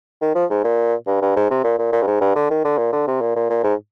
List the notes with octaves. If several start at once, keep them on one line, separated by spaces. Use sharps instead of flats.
D#3
F3
G#2
A#2
G2
G2
G#2
C3
A#2
A#2
A#2
G2
G#2
G2
D3
D#3
D3
A#2
D3
C3
A#2
A#2
A#2
G#2